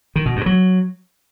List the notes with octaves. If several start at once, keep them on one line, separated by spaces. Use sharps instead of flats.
D#3
B2
G2
F#3